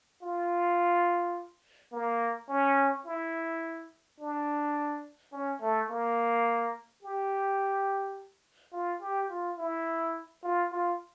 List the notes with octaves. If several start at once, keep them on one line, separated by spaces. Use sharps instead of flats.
F4
A#3
C#4
E4
D4
C#4
A3
A#3
G4
F4
G4
F4
E4
F4
F4